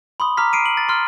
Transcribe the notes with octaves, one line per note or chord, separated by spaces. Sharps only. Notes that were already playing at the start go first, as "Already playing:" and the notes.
B5 C6 D#6
A#5 D6 F6 B6
C7 D7 D#7
F#7
A6
C6 F6